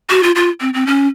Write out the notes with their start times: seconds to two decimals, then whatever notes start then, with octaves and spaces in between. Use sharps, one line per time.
0.10 F#4
0.23 F4
0.36 F4
0.61 C4
0.74 C4
0.87 C#4